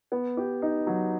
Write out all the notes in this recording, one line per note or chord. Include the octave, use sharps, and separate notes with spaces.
B3
G4
D#4
F#3